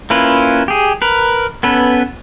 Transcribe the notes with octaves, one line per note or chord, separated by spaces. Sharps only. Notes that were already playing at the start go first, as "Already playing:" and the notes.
A#3 C#4 E4 F4 B4
G4 G#4
A#4 B4
B3 C#4 A4 B4